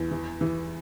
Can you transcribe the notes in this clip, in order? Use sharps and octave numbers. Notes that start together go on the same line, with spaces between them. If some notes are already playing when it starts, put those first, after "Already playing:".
Already playing: E2
E3
E3